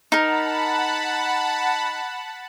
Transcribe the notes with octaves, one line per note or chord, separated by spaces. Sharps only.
D#4 A#4 F#5 A5 B5